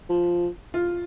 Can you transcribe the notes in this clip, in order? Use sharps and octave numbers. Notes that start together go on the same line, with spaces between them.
F3
F4